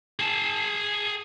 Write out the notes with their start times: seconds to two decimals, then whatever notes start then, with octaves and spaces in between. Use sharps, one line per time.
0.19 G#4 A5